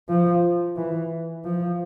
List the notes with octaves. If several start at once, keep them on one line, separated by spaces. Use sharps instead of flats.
F3
E3
F3